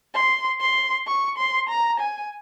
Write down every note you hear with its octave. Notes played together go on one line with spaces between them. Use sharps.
C6
C6
C#6
C6
A#5
G#5